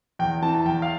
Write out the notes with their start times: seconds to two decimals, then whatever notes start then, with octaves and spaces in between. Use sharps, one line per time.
0.19 E2 G5
0.42 E3 A5
0.55 A5
0.65 E2 G5
0.82 F5